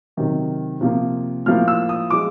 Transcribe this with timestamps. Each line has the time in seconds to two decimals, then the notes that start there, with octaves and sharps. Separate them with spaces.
0.17 C3 D#3 F#3
0.81 C3 F3 A#3
1.46 A2 F3 A#3 F6
1.68 E6
1.89 D#6
2.10 F3 G#3 D6